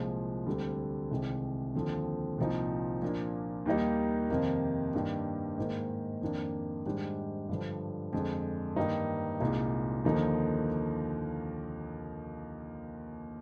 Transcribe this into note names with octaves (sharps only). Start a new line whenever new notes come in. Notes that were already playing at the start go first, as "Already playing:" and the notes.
Already playing: C2 A#2 F3 G#3
D2 D3 G3 C4
C2 C3 D#3 G#3
D#2 D3 F3 C4
C2 A#2 F3 C4 D#4
A#2 F3 A#3 D4
D#2 D#3 G3 A#3 D#4
F2 C3 D#3 A#3
G2 D#3 A#3 D4
G#2 D#3 A#3
F2 D#3 A#3 D4
G#2 D#3 G3 D4
G2 D3 F3
F2 D3 G#3 D4
G2 D#3 A#3 D#4
C2 A#2 G#3 D#4
D#2 D3 F3 A#3 D#4